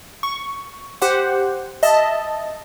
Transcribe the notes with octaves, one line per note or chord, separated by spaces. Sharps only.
C#6
G4 C5 F#5
D#5 E5 A5